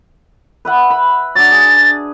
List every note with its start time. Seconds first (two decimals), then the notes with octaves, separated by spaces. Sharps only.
0.65 B4 E5 F#5
0.90 B5
1.35 F#3 D4 A6
1.51 G#4